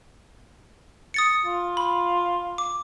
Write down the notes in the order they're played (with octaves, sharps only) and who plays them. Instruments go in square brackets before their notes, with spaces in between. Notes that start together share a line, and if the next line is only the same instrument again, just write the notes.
[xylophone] D#6 A6 C#7
[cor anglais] F4
[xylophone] B5
D6